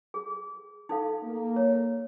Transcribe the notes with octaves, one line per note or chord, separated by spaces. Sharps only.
G#4
D#4 A4 F5
A#3
C#5